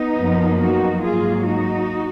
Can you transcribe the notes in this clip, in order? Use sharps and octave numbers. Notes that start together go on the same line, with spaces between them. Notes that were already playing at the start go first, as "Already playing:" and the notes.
Already playing: B3 D#4
F#2 F3 A#3
D#4 F#4
G#2 F#3 A#3 F4 G#4
D#4 F#4